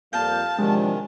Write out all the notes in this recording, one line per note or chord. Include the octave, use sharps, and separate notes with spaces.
F2 G3 A#3 F5 A5 G6
C3 D#3 F3 F#3 G#3 D4